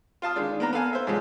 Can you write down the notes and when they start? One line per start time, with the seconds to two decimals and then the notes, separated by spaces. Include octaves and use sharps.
0.22 F4 F5 A5 D#6
0.36 D#3 G#3 D4
0.60 A#3 B3 A#5
0.73 B3 A4 F5 G#5
0.93 C5 E5
1.07 G#2 F3 F#3 G#3 D#4 F4